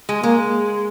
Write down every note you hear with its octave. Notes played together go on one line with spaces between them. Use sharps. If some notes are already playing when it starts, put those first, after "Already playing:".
G#3
G#3 A#3